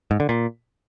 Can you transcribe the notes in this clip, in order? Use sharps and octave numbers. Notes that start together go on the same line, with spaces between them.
G#2
D3
A#2